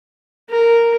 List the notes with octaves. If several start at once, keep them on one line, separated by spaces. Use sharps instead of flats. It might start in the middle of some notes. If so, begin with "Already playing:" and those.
A#4